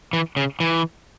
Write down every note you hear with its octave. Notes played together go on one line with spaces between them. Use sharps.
E3
C#3
E3